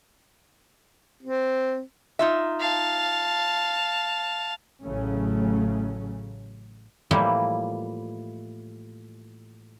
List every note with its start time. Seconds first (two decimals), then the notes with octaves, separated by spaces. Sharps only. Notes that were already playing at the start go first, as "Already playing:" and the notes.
1.23 C4
2.19 D#4 F4 E5
2.60 F5 A5
4.84 A1 A2 C#3 F#3 A3 C#4
7.11 A2 E3 F3 G3 A#3 E4